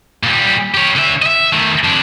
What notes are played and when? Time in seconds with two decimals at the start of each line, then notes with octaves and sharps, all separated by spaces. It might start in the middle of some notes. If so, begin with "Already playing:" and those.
0.23 A#2 G3
0.74 G4 C#5
0.96 D3 E5
1.22 D#5 E5
1.53 D#3 A3
1.83 F2 D4